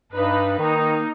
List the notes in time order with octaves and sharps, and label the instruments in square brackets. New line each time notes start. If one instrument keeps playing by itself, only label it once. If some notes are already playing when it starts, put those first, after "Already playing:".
[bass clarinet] G2 [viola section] D4 D#4 B4
[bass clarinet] D#3 [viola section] A#3 D#4